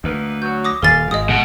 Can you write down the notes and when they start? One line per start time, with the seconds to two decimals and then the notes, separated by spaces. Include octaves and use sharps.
0.04 D2 D#3 A#3 B4
0.42 F#3 G6
0.65 D6 D#6 A#6
0.82 D#1 D#2 A#4 F5 G#5 A6
1.11 G#1 G#3 D#5 D#6
1.29 B2 A3 A#3 F#4